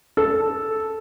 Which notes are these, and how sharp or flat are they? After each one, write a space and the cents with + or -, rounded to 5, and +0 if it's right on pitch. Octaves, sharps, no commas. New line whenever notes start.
A4 -5